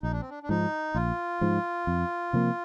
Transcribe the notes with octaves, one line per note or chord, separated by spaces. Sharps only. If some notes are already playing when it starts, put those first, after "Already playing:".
A#1 D#4
D4
C4
D4
D4
G#2 F3 D#4
A#1 F4
G#2 F3
F2
C3 F3 A#3